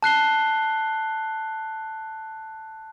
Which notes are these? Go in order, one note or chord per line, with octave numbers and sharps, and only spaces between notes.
A5 F#6 C7 G7